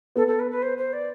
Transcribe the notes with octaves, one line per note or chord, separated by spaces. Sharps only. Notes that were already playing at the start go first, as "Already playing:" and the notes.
B3 A4
A4
B4
B4
C5
C5
D5